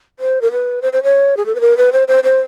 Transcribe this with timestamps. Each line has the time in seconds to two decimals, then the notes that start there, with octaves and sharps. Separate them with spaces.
0.19 C5
0.41 A#4
0.52 B4
0.82 C5
0.93 C5
1.03 C#5
1.37 G#4
1.46 A4
1.55 B4
1.61 A#4
1.77 B4
1.92 C5
2.08 C5
2.24 C5